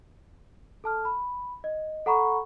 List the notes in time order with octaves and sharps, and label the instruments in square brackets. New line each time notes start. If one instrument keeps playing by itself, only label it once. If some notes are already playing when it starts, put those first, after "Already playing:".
[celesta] A4 A5 F6
B5
D#5
A4 F#5 A#5 B5 C#6